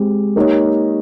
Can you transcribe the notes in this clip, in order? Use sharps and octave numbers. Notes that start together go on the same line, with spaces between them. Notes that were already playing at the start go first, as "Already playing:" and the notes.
Already playing: G#3 C4 G4
A#3 D#4 G4 C#5